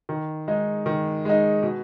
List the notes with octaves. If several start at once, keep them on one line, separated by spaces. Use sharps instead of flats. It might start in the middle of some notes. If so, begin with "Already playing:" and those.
D#3
G#3 D#4
D#3
G#3 D#4
B2